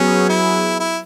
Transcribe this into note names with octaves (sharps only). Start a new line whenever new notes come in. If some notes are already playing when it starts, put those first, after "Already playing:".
Already playing: F#3 B3 C#4 G#4
E4
E4